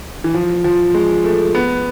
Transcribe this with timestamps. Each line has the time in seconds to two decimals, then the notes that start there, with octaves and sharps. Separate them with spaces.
0.24 E3
0.34 F3
0.64 F3
0.94 G#3
1.24 A3
1.55 B3